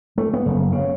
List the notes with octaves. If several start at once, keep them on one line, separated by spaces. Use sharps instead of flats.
A3
B3
F#1
C#3